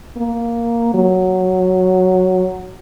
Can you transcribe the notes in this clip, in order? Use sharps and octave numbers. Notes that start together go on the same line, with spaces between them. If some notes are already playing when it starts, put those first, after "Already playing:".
A#3
F#3